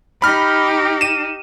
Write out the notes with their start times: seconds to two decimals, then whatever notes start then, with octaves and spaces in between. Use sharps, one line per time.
0.22 D#4 G4 B5 F6
1.01 D#7 E7